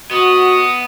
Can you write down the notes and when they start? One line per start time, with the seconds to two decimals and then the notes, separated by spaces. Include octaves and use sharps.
0.11 B3 F#4 D#5